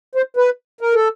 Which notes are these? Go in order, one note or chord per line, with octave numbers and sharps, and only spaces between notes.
C5
B4
A#4
A4